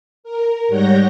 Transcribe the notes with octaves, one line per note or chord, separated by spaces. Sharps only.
A#4
G#2 G3 C#5 F#5 G6 A#6